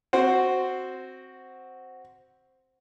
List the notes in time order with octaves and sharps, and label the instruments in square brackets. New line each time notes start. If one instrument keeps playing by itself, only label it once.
[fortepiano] C4 F#4 C5